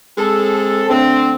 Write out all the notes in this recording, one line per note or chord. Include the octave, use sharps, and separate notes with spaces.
G#3 C4 A4
D3 A3 C4